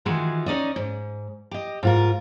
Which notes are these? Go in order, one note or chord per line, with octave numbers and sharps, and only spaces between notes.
D#3 E3 G#3 F4 F#4
C#4 D#4 D5 D#5
G#2
G4 D#5
G#2 F4 A#4